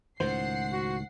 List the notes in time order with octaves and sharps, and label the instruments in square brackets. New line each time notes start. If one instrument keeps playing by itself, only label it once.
[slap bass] C#2 A2 D#3 [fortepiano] C5 [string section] F#5 C7
[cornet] F#4